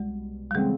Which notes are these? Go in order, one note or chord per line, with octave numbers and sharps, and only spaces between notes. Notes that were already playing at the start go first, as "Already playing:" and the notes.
Already playing: C2 B2 G3 G#3
G3
C#3 E3 G#3 A3 C4